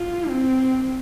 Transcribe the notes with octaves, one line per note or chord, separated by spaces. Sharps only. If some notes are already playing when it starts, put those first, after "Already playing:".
Already playing: F4
C4